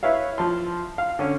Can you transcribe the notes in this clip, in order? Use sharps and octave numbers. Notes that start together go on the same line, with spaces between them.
E4 B4 C#5 E5 F5
F3 A5 C6
F5
D3 C#4